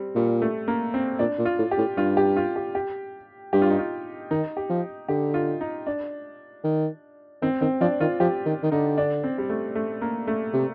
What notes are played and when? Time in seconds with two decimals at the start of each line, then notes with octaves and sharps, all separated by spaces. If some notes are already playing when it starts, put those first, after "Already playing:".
Already playing: G3 C4
0.15 A#2 G3
0.42 A3
0.68 A#3
0.94 C4
1.19 A#2 D4
1.39 A#2
1.45 F4
1.58 A2
1.71 G4
1.78 A2
1.97 G2 F4
2.17 G4
2.37 F4
2.56 G4
2.75 G4
3.53 G2 G4
3.62 F4
3.70 D#4
3.79 F4
4.31 D#3 D#4
4.57 G4
4.70 F3
5.08 D3 G4
5.34 F4
5.61 D#4
5.87 D4
6.64 D#3
7.42 D#3 C4
7.61 D#3 C4
7.81 F3 D4
8.00 D#3 F4
8.20 F3 G4
8.46 D#3
8.63 D#3
8.72 D3 D#4
8.98 D4
9.24 C4
9.38 G3
9.50 A3
9.75 A3
10.02 A#3
10.27 A3
10.54 C3